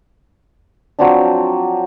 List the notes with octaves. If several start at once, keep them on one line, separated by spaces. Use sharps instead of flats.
F3 F#3 C4 D4